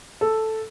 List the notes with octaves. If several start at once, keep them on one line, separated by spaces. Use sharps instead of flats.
A4